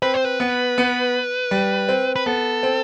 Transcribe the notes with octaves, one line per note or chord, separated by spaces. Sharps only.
C4 B4
C5
B4
B3
B3
G3
C4
B4
B3 A4
C4